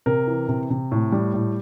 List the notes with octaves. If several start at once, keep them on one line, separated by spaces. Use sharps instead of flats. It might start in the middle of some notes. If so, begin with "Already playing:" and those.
C3 A#4
E3
C3
C3
A2
G3
A2